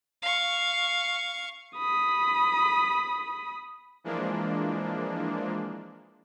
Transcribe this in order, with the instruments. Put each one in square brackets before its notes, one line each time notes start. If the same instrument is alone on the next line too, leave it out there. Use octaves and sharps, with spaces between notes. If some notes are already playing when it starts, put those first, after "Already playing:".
[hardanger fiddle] F5 C#6
[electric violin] B5 D#6
[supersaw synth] E3 F3 G#3 A#3 D4